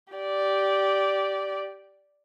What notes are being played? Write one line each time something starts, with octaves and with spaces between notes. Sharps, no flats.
G4 D5